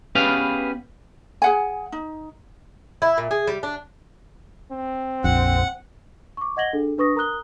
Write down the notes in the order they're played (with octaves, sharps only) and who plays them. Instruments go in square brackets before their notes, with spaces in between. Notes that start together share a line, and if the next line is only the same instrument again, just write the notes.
[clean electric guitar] B3 C#4 G4 G#4 B4 F5
[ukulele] G#4 F#5 G#5
D#4
[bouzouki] E4
A#2
G#4
G3
D4
[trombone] C4
[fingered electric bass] A#1 F2 [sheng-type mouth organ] F#5
[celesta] C#6 D6
D#5 F#5 G#6 A#6 F#7 G7
D4 G#4 A4
D4 B4 C#6 D#6 A#6
A#4 A#5 D#6 F#6 G7